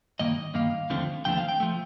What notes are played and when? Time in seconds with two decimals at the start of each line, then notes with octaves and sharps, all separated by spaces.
0.19 G2 D#3 A#3 D#5
0.54 G2 D#3 A#3 F5
0.90 D#2 D3 F3 A3 C4
1.25 D#2 D3 F3 A3 C4 G5
1.37 F5
1.49 G5
1.60 F3 A3